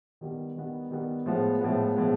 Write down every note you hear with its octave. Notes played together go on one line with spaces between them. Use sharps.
D#3 G3 B3
D#3 G3 B3
D#3 G3 B3
A2 F3 G#3 B3
A2 F3 G#3 B3
A2 F3 G#3 B3